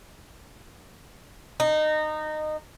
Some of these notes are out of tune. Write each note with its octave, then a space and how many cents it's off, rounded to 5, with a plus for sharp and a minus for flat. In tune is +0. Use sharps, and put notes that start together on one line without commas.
D#4 -20